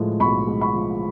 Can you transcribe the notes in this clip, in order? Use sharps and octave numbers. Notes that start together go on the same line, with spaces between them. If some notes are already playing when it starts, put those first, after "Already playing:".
Already playing: A2 F3 G#3
B1 B5 C#6
G#3
B5 C#6
F3